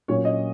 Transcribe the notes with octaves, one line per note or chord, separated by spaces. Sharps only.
A#2 F#3 C#4 C#5
D#5